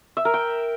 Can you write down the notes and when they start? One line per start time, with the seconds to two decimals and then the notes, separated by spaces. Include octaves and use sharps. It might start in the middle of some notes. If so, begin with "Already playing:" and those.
0.17 E5
0.25 A#4
0.34 G5